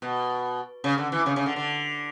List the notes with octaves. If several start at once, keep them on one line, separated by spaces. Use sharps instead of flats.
B2
C#3
D3
E3
C#3
C#3
D3
D3